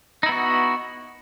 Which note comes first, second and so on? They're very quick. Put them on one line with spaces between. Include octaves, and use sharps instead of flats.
D#4 E4 B3 F#4